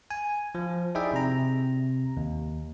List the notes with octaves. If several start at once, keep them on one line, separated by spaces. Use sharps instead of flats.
G#5
F3
D#4 E4 G#4 D5 E5 G5
C3 A#5
D#2